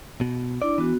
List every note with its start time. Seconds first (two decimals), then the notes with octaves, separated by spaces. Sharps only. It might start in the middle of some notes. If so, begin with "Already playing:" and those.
0.21 B2
0.62 D4 E4 D5 D6
0.78 E3 B3 F#4